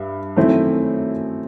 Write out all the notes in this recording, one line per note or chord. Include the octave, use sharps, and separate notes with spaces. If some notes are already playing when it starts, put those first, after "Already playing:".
Already playing: G2 E5
F#2 D#3 A3 C4 E4